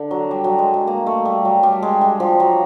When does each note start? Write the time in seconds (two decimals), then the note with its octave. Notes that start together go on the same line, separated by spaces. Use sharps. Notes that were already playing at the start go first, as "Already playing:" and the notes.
Already playing: D3
0.11 F#3
0.31 G3
0.44 F#3
0.59 G#3
0.74 G#3
0.87 A#3
1.07 A3
1.25 G3
1.45 F#3
1.63 G3
1.83 G#3
2.01 G3
2.20 F3
2.40 F#3